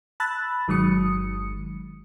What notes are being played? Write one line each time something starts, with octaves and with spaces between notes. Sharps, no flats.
A5 B5 E6 F#6 A6
G1 D#3 F#3 G#3 D#6 C#7